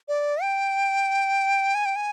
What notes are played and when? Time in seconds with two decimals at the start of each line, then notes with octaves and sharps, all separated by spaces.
0.08 D5
0.42 G5
1.75 G#5
1.86 G5
1.96 G#5